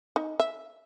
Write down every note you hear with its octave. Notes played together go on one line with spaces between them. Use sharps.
D#4
E5